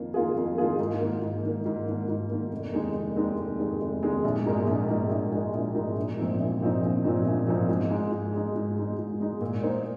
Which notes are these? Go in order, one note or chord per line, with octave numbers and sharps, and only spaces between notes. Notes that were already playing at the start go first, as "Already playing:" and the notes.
Already playing: F2 D#3 A#3 F4
D#3 A#3 F4 G#4
F2
D#3 A#3 F4 G#4
G#2
D#3 A#3
G#2
D#3 A#3
G#2
D#3 A#3
G#2
D#3 A#3
F1
D#2 D#3 G#3 D#4
F1
D#2 D#3 G#3 D#4
F1
D#2 D#3 G#3 D#4
F1
D#2 D#3 G#3 D#4
A#1
G#2 G#3 D#4 A#4
A#1
G#2 G#3 D#4 A#4
A#1
G#2 G#3 D#4 A#4
A#1
G#2 G#3 D#4 A#4
A#1
A#2 F3 C4 D#4
A#1
A#2 F3 C4 D#4
A#1
A#2 F3 C4 D#4
A#1
A#2 F3 C4 D#4
G#2
G#3 D#4
G#2
G#3 D#4
G#2
G#3 D#4
G#2
G#3 D#4
A#2
A#3 D#4 C5